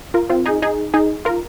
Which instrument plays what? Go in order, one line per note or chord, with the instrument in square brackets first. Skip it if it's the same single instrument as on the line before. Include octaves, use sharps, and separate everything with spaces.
[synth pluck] F4 A#4
C4 F4
D#4 G#4
D#4 G#4
D#4 G#4
F4 A#4